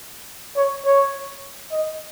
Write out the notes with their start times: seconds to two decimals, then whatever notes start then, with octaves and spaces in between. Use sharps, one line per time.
0.57 C#5
0.85 C#5
1.72 D#5